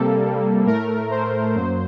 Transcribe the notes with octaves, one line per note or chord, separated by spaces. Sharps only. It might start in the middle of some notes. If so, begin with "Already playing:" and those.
Already playing: C3 G3 A#3 A4
A2 A3 A#4
C5
F#2 F#3 A#3 C5